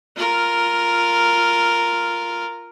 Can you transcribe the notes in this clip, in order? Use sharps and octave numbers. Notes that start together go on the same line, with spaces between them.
F4 A#4